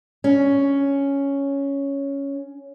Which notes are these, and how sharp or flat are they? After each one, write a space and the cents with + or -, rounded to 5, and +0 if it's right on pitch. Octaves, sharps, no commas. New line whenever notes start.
C#4 +5